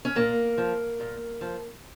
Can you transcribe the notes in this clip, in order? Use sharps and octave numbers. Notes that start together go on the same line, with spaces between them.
C#4
A#2 A#3
F3
A#2
F3